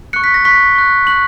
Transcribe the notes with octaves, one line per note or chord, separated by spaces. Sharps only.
C#6 F#6 C#7
B6
A#6
C#6 F#6 B6
C#6 F#6
C#6 F#6 F#7